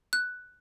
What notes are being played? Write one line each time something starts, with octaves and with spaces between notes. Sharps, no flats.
F#6